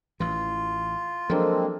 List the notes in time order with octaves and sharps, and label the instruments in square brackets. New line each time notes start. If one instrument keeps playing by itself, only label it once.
[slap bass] A1 E3 [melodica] F4
[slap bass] F3 F#3 [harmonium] G#3 A#3 C4 [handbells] D4 A4 A#4